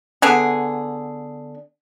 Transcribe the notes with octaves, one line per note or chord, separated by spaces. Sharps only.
D3 B3 G#4